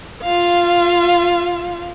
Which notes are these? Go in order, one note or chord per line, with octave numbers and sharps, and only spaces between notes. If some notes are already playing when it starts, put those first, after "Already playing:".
F4 F5